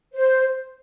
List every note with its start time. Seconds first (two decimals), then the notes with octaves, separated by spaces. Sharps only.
0.13 C5